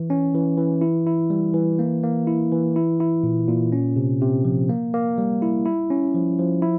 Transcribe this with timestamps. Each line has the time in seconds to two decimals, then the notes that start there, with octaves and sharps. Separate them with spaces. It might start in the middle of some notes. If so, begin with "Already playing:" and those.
Already playing: E3
0.10 C#4
0.34 E3
0.58 E3
0.81 E4
1.07 E4
1.30 G3
1.54 E3
1.79 A#3
2.03 A#3
2.27 E4
2.52 E3
2.76 E4
3.00 E4
3.23 A#2
3.48 A#2
3.72 C#4
3.96 C3
4.21 C3
4.45 F3
4.69 A#3
4.94 A#3
5.18 G3
5.42 E4
5.66 E4
5.90 C#4
6.15 F3
6.39 F3
6.62 E4